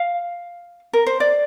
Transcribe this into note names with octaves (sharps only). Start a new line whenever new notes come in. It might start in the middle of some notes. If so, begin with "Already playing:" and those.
Already playing: F5
A#4
C5
D5